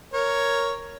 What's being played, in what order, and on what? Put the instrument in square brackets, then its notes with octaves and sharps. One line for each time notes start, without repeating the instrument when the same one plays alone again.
[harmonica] A#4 C#5